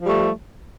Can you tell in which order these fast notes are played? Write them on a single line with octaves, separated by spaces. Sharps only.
F3 G3 A3